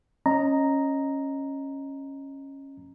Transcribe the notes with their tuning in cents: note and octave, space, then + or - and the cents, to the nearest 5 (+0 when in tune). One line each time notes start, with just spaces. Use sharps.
C#4 -15 D#5 +0 A#5 +0